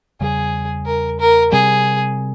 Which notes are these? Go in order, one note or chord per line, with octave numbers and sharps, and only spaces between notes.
E2 C#3 G3 G#4
A#4
A#4
C3 G3 C4 G#4